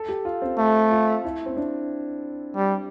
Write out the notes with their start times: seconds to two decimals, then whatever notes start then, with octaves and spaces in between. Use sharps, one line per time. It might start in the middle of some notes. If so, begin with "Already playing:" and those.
Already playing: A4
0.09 G4
0.25 F4
0.42 C4
0.58 A3
0.91 F4
1.24 E4
1.46 C4
1.57 D4
2.56 G3